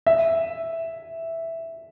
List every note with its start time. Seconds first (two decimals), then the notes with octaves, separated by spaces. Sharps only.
0.06 E5